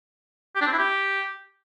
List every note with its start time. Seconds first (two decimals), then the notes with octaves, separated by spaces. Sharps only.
0.56 G4
0.61 D4
0.67 C4
0.73 E4
0.78 G4